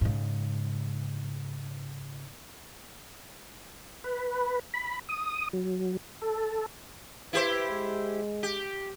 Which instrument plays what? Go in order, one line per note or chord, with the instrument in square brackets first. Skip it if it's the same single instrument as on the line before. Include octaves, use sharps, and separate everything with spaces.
[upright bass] G#2 C#3
[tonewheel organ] B4
B5
D#6
F#3
A4
[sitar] E4 G4 C5 [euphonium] B4
[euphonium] G#3
[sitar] G4